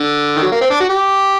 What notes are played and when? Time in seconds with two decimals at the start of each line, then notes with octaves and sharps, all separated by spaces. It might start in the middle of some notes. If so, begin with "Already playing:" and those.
Already playing: D3
0.36 D#3
0.42 F#3
0.52 A#3
0.61 C4
0.70 D4
0.80 F#4
0.89 G4